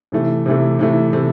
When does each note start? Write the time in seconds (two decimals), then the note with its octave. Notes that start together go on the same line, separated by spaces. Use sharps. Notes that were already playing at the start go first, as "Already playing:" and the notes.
0.12 C3 E3 A3
0.46 C3 E3 A3
0.79 C3 E3 A3
1.13 C3 E3 A3